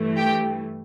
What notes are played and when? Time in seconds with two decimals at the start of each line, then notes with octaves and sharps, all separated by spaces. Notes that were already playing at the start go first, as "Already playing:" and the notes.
Already playing: G2 E3 A3
0.17 G4 G5